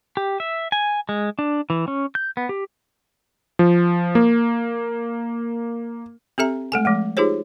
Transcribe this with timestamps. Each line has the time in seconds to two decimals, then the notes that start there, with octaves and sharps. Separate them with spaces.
0.17 G4
0.40 E5
0.72 G#5
1.09 G#3
1.39 D4
1.70 E3
1.88 C#4
2.15 G6
2.37 B3
2.49 G4
3.59 F3
4.15 A#3
6.38 C4 G4 A4 E5 A#5
6.72 G#3 A3 A4 G#5
6.85 F3 G#3 A3
7.17 D#4 F4 G4 G#4 C5 C#5